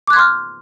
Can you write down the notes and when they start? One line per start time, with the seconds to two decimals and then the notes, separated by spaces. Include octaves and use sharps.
0.07 D6
0.10 F#6
0.13 G#6
0.16 C6
0.19 F6